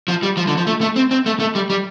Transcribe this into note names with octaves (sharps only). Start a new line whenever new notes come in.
F3
G3
F3
D3
F3
A3
A3
C4
C4
A3
A3
G3
G3